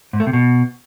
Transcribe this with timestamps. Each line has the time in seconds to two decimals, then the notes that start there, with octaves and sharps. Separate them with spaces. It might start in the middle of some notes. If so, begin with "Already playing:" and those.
0.13 G#2
0.20 A3
0.27 C3
0.33 B2